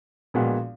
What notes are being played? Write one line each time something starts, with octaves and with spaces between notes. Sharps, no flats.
A#1 A#2 G#3 B3 F#4